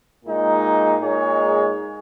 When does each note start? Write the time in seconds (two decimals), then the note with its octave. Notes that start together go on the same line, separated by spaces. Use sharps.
0.24 A#2 G#3 D#4
1.01 A#2 G#3 D#4 G#4 C#5